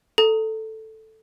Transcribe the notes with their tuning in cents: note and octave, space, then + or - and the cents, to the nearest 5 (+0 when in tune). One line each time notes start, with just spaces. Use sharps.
A4 +0 A#5 -25